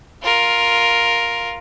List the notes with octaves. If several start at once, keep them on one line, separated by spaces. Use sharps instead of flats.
F4 A#4